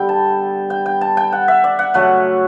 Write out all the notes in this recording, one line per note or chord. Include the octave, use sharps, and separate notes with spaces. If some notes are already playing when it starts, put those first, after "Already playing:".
Already playing: D3 G3 B3 G5
A5
G5
G5
A5
G5
F#5
E5
D5
F#5
C#3 F#3 A3 F#5